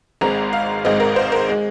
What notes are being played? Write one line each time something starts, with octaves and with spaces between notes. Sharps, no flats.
G#1 G#2 G#3 C4 A#5
F5
G#1 G#2 G#3 C4 D#5
A#4
C5
A#4
G#3